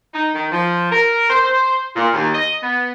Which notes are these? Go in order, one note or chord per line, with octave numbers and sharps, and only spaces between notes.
D#4
D#3
F3
A#4
C5
C5
A#2
D#2
D#5
B3